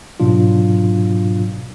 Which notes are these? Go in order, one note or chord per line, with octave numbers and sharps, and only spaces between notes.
G#2 B2 F#3 D4 F4